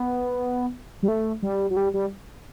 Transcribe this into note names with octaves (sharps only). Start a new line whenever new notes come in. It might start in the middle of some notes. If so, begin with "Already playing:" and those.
Already playing: B3
G3
A3
G3
F#3
G3
G3